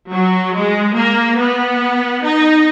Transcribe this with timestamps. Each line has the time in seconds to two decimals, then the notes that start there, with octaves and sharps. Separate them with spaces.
0.11 F#3
0.54 G#3
0.95 A#3
1.38 B3
2.23 D#4